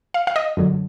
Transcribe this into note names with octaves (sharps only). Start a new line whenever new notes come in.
F5
F5
D#5
F#2 D3 F#3